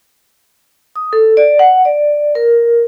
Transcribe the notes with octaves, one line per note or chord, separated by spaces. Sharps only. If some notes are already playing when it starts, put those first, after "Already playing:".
D#6
A4
D5
F#5
D5
A#4